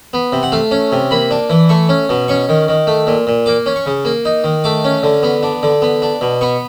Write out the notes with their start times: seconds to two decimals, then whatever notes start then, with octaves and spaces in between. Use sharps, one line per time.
0.13 B3
0.32 C3
0.43 F#5
0.52 A3 F5
0.71 C#4
0.92 C3
1.11 A#3 B5
1.31 D4
1.50 E3
1.69 A3 C#6
1.89 C#4
2.09 B2
2.28 C#4 C#6
2.49 D#3
2.68 D#3
2.87 A3
3.07 A#2
3.27 A#2
3.46 A#3 D6
3.66 C#4
3.76 C#6
3.86 C#3
4.05 A#3
4.25 D#4
4.44 D#3
4.64 A3 D6
4.84 C#4
5.03 D3
5.23 B3
5.43 D4
5.63 D3
5.82 B3
6.02 D4
6.21 B2
6.41 B3 C#6